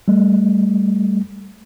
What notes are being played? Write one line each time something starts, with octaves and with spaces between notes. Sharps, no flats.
G3 A3